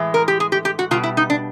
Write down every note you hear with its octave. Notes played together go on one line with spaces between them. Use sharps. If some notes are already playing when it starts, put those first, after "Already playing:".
Already playing: A2 E3 G#3
A#4
G4
G#4
G4
G4
F#4
B2 G3 F4
E4
D#4
D4